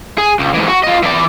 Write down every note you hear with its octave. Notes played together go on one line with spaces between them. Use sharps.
G#4
C#2
G#2 E3
F#4
F4 D#5
E3 D5